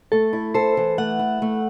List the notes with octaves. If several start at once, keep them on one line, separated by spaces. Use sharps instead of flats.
A3 A4
E4
A4 C5
E3
A3 F#5
E4
A3